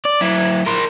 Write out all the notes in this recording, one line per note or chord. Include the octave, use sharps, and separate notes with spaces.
D5
F#3 E4
A#4 C5